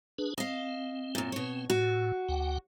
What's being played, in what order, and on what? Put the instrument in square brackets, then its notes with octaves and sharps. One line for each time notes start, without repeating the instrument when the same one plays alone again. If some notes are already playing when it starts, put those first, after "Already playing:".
[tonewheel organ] D4 G#4 B4
[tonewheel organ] C4 [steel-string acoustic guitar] D#5 F5
[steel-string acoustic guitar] F#2 A#2
B2 C#5
[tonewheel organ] A2 [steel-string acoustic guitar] F#4
[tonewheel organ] D2 F#5 G5